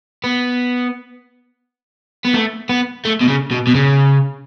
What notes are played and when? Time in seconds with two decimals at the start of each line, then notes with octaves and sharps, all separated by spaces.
0.24 B3
2.25 B3
2.34 A3
2.69 B3
3.05 A3
3.21 B2
3.28 C#3
3.51 B2
3.67 B2
3.75 C#3